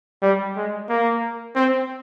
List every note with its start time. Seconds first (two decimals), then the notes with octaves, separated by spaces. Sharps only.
0.22 G3
0.56 G#3
0.89 A#3
1.55 C4